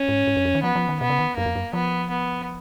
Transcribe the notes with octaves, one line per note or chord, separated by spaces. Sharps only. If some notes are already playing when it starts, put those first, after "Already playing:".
Already playing: C#4
G#2
G#2
F#2
F2
D#3
F3 B3
F3
D#3
B2 B3
C#3
D#3
F#2 A#3
F2
F#2
F3 B3
B3